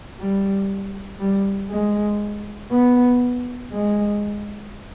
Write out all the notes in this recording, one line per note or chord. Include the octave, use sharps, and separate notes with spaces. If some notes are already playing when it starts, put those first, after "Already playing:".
G3
G3
G#3
B3
G#3